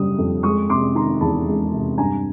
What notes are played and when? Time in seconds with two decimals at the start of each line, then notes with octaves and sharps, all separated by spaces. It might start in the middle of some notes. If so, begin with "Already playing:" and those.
Already playing: F#1 D3 G3 D#6
0.18 F2
0.43 G#3 C#6 D#6
0.69 C3 C6 D6
0.95 D#3 A#5 C6
1.20 E2 A5 B5
1.47 G#3
1.72 C3
1.98 G2 G#5 A#5